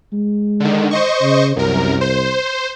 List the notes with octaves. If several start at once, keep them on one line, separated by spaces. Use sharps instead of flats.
G#3
D3 D#3
C5 D#5 C#6
C#3
C2 F#2 A#4
C5